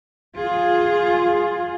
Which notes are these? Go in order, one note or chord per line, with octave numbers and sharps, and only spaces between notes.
F4 G#4